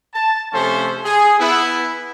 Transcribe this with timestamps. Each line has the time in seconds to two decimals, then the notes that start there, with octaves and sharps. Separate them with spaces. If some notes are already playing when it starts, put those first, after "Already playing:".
0.14 A5
0.53 C3 F3 A3 C#4 A4 C5
1.04 G#4
1.40 B3 E4